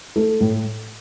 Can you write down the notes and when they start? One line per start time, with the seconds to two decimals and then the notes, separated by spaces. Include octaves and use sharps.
0.16 A3
0.41 A2